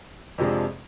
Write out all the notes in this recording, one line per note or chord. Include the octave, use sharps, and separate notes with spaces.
F2 C3 F3 G#3 D4